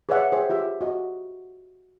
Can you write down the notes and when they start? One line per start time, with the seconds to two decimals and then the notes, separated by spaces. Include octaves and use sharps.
0.09 G#4 B4 C#5 D5 E5 F#5
0.32 G#4 C5 E5 G5
0.50 F4 G4 E5
0.81 F#4 D#5